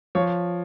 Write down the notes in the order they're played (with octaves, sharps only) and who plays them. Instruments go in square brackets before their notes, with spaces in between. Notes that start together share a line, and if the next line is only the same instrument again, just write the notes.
[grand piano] F3 C#5